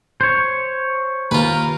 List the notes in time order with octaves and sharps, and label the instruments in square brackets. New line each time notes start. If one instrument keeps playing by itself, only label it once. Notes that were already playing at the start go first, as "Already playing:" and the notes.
[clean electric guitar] C5 C#5
[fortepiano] D#2 [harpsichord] F4 B4 [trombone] A#4